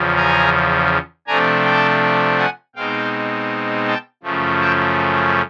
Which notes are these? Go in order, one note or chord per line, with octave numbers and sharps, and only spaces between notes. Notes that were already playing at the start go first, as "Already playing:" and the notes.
Already playing: E2 C#3 F3
G#5 A#5
C3 F3 A3 D4 G#5 A#5
G5 A5
F#5 G#5
B2 G#3 C4 D#4 F5 G5
G5 A5
F#2 C#3 F3 A3
G5 A5